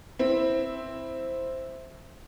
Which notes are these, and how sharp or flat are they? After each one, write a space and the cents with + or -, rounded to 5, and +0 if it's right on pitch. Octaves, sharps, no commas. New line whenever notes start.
C4 +0 E4 +0